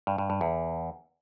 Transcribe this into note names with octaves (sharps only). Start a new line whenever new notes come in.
G2
G2
G2
E2